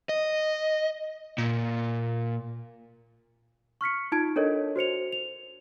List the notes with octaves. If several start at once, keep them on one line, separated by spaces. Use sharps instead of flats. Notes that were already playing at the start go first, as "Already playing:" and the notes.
D#5
A#2
C#6 F6 B6 C#7
D#4 F4 A5 G#6 D7
D4 A4 A#4 C#5 D#5
F#4 C5 C#7 F7
F7